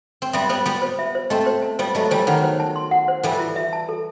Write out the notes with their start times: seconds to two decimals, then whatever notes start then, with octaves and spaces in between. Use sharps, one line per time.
0.22 C4
0.33 G3 B3 E5
0.49 G3 B3 C5
0.65 G3 B3 B5
0.82 C5
0.99 E5
1.15 C5
1.30 A3 C4 D#5
1.46 C5
1.62 A5
1.79 G3 B3 C5
1.95 F#3 A3 D#5
2.10 E3 G3 C5
2.27 D#3 F#3 F#5
2.43 C5
2.60 A5
2.76 C6
2.91 F#5
3.08 C5
3.23 E3 G3 A4
3.39 E4
3.56 E5
3.73 A5
3.89 A4